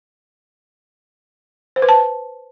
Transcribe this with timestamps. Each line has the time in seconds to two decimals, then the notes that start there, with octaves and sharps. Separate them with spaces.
1.76 C5
1.82 B4
1.89 A5